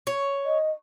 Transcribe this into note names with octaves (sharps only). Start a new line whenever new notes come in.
C#5
D#5